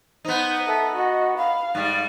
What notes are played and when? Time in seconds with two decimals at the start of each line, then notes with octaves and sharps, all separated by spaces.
0.25 B3 D#4 C5
0.66 A4 E5
0.95 F#4 D#5
1.37 F5 B5
1.75 G#2 G3 A6